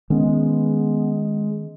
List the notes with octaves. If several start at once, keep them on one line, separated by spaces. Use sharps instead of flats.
D#3 G#3 B3 C#4